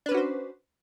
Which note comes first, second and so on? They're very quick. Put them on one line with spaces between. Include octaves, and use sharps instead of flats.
D4 B4 C#4 F#4 C5